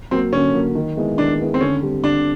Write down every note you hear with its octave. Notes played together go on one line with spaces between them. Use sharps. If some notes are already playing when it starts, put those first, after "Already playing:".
F#3 A#3 C4
D3 C#4
F#3 A#3
D#3
G#3 B3 E4
D#3 D4
G#3 B3 E4
C4
D3 C#4
G3 C4
D3 D4